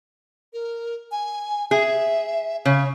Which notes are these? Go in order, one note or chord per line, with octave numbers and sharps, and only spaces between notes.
A#4
G#5
G#4 E5
C#3 C#5